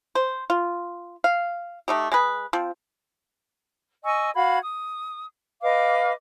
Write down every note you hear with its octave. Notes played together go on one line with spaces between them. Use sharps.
C5
F4
F5
A3 D#4 G4
G#3 G#4 B4
F3 C4
D#5 G#5 C#6 E6
F#4 F5 B5 G#6
D#6
B4 D#5 F5 D6